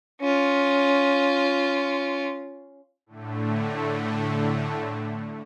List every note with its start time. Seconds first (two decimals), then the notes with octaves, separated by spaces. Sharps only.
0.21 C#4 F4
3.06 A2 D3 A3